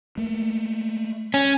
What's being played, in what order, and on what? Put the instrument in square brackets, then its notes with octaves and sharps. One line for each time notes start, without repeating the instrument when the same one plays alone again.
[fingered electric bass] A3 A#3
[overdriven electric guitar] C#4